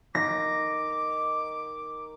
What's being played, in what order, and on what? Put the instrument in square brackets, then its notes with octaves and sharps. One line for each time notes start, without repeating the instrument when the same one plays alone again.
[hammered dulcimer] D#3 [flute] D6 [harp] A#6